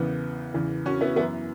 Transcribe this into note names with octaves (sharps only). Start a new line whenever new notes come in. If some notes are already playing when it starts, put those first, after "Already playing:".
Already playing: E2 C#3 E3 B3
E2 C#3 E3
C#4 F#4
B3 E4
F#2 E3 B3 E4